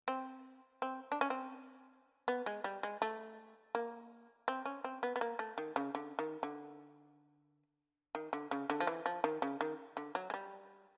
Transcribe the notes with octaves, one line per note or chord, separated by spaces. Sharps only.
C4
C4
D4
C#4
C4
B3
G#3
G3
G#3
A3
A#3
C4
C#4
C4
B3
B3
A#3
A3
D#3
C#3
D3
D#3
D3
D#3
D3
C#3
D3
F3
E3
F3
D#3
C#3
D#3
D3
F#3
G#3
G3